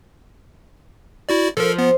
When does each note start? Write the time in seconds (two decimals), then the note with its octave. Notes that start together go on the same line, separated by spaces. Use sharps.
1.29 E4 F#4 D5
1.57 F3 A4 A#4
1.78 B3